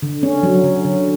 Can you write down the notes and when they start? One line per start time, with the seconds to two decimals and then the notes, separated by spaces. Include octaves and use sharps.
0.02 D3
0.23 C#4
0.43 F#3
0.64 D3
0.85 D3